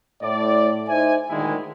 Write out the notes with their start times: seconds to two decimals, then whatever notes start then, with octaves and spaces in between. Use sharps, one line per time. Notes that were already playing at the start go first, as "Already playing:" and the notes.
0.22 A2 D5
0.89 D#4 C5 E5 G#5
1.30 D2 A#2 D#3 G#3 E4 G#5